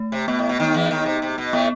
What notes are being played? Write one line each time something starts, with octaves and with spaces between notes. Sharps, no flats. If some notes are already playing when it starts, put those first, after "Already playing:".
Already playing: A3
C3
B2 B3
A2
B2
D#2 D#3
E2 E3
D#2 D#3
C3
C3
B2
A2 A3 B3